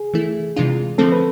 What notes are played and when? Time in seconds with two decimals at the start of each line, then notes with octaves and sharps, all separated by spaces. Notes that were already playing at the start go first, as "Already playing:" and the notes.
Already playing: G#4
0.14 E3 A3 E4
0.56 C3 E3 G#3 D4 F4
0.98 D3 F3 A3 C4 A4
1.12 B4